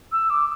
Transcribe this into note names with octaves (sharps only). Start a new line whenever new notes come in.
E6
D6